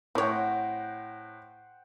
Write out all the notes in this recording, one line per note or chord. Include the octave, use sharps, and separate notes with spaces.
A2 C4 C5 C#5 F#5 G5